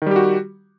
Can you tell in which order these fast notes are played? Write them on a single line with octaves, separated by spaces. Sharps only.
D#3 G3 G4 F#4